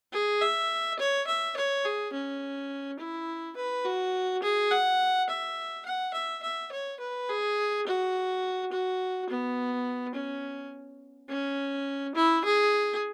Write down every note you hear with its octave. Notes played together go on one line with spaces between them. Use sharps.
G#4
E5
C#5
E5
C#5
G#4
C#4
E4
B4
F#4
G#4
F#5
E5
F#5
E5
E5
C#5
B4
G#4
F#4
F#4
B3
C#4
C#4
E4
G#4